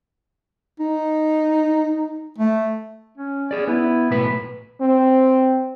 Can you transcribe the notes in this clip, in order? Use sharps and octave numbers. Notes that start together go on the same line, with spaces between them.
D#4
A3
C#4
C#4 G#4 D5
B3 E4
B1 A2 B4
C4